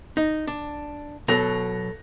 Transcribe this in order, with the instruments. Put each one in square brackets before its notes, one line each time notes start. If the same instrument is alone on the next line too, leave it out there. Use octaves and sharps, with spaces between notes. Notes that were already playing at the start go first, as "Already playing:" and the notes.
[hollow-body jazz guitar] D#4
D4
[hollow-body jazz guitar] B2 F#3 [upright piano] A4 A#6 F7